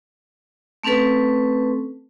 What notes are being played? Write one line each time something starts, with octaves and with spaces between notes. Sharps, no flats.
A3 C4 C#4 A4 B4